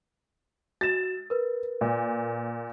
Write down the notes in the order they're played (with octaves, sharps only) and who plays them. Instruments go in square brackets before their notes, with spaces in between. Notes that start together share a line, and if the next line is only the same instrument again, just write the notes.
[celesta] F#4 E7 [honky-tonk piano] A6
[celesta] A#4 B4
[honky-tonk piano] A#2